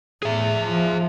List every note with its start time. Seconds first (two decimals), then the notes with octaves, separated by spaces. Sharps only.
0.23 A2 G#4 E5
0.62 F3